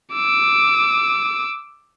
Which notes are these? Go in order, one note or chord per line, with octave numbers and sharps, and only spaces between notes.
D6 E6